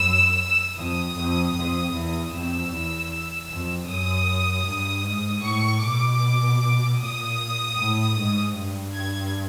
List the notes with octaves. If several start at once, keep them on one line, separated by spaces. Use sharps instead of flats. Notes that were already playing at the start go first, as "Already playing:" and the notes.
Already playing: F#2 E6
F2 D#6
F2
F2
E2
F2 E6
E2
F2
F#2 D#6
G2
G#2
A2 C#6
B2 D6
A#2 D#6
A2
G#2
G2
G#6